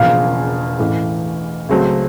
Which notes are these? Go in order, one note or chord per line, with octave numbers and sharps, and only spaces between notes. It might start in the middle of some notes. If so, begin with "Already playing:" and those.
Already playing: E1 E2 C#3 F3 A#3 F5
A1 A2 E3
C#2 C#3 F#3 A3 C4